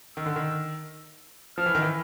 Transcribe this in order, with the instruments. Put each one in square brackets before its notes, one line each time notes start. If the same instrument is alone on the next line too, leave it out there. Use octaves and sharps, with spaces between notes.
[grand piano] D#3 [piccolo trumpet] E6
[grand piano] D3
D#3
[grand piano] F3 [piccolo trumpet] F6
[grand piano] E3
D#3
E3